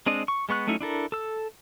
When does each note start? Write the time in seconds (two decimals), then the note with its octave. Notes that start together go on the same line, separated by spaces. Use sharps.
0.06 G#3 C4 D4 D#5
0.28 C#6
0.49 G#3 B3 C#6 F#6
0.67 F#3 A3 C#4 D#4 E4
0.81 D4 E4 A4 A#4
1.12 A4 E6